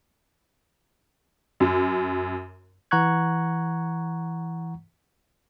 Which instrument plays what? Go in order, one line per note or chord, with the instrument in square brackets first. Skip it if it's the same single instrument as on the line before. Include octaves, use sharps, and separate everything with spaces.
[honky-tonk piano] F#2
[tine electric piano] E3 F#5 A#5 C#6 F#6 G#6